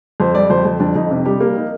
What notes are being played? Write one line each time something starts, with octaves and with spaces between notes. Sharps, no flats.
F2 C5
G3 D5
F2 C5
F2
F2 D4
F2 D#4
C3
G3 G4
A#3 G4
D#4